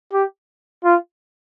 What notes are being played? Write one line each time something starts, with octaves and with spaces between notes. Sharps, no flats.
G4
F4